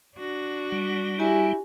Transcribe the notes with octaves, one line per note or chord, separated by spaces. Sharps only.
D4 F#4
G3
E4 G4 G#5